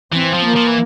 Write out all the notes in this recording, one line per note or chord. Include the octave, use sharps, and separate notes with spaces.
E3 C4
F3
A#3
F3
E3